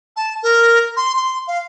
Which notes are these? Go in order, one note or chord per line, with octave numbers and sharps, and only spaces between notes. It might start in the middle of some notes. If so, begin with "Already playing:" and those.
A5
A#4
C6
C6
F5